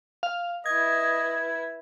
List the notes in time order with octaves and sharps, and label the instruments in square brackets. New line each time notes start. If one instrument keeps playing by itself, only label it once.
[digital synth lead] F5
[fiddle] E4 B4 [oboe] D#5 [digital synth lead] G#6